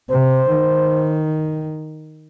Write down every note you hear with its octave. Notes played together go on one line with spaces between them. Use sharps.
C3 C5
D#3